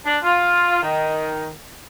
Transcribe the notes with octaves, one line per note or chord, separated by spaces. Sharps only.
D4
F4
D#3